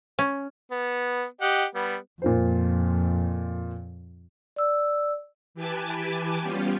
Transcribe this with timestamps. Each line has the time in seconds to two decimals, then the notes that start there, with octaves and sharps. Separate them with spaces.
0.19 C#4
0.71 B3
1.41 G4 D#5 F#5
1.75 G3 B3
2.22 F2 A#2 F4 C5
4.56 D5 E6
5.54 E3 G4 B4 G#5 A5 D6
6.41 G3 B3 C#4 F4 G4